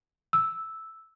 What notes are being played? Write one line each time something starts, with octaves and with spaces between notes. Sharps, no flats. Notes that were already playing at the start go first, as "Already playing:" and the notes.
E6